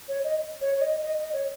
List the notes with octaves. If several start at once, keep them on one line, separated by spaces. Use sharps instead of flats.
C#5
D#5
C#5
C#5
D#5
D#5
D#5
C#5